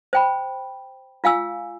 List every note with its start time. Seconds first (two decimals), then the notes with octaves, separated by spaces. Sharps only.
0.13 C5 G5 B5
1.24 F4 F5 G#5 E6